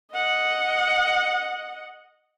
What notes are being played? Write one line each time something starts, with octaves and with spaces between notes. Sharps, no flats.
D#5 F#5